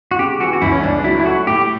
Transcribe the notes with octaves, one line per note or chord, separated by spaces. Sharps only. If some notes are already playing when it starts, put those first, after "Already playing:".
F#4
C#3 G4
E3 F#4
F#4
C#2 E4
C#4
C#2 D4
F#3 E4
E4
A3 F#4
A2 G4